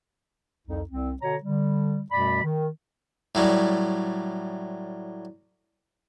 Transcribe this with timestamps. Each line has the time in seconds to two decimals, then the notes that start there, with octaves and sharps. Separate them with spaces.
0.67 C2 F2 D#4
0.90 C2 C4
1.22 B2 D3 C#5 A#5
1.44 D3 G3
2.11 F#2 B2 G3 A3 D5 B5
2.43 D#3
3.35 A2 F#3 G3